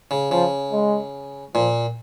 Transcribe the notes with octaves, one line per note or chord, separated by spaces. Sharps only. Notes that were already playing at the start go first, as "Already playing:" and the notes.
C#3
C#3 F3
G#3
A#2 F3